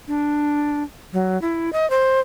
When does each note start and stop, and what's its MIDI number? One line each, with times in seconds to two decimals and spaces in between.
0.08 0.83 62
1.13 1.40 54
1.42 1.70 64
1.73 1.88 75
1.90 2.20 72